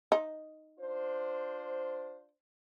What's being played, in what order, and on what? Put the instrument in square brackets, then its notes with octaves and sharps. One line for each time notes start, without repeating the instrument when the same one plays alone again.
[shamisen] D#4
[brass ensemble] D4 F4 C5